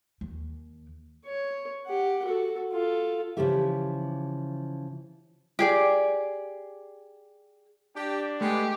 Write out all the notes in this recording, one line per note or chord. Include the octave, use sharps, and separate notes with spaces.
D#2
C#5
G4 F#5
F#4 A4
F4 A4
C#3 E3 F3 E4 G4 E5
G4 G#4 D5
D4 G4
G#3 A3 B3 G4